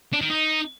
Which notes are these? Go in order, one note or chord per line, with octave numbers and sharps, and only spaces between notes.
D4
D#3
D#4